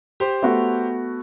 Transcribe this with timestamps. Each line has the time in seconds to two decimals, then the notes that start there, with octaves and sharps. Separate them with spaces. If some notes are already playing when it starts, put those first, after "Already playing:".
0.20 G4 C5
0.43 A3 B3 F#4